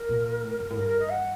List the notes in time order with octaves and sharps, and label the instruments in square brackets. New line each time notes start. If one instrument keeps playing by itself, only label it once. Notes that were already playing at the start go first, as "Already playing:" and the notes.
Already playing: [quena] A#4
[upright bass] A#2
A2
F#2
A2
[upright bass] G2 [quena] A#4
[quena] A#4
D#5
F#5